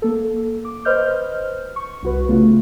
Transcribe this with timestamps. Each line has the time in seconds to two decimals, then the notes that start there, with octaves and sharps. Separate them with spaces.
0.02 A#3 A4
0.65 D6
0.85 B4 C5 D#5 F6 G6
1.76 C#6
2.03 C2 F#4 B4
2.28 C#3 A3 B3 F4